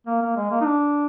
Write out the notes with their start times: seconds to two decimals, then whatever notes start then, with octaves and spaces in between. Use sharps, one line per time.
0.07 A#3
0.22 A#3
0.36 G#3
0.51 A#3
0.61 D#4
0.65 D4